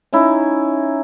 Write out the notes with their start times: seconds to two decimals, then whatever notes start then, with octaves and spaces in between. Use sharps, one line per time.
0.13 C#4 D#4 E4